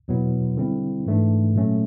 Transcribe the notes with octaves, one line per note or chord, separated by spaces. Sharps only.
E2 B2 F#3 B3 E4
D3 G3 C4 E4
G#2 E3 A3 D4
A#2 F#3 A3 C#4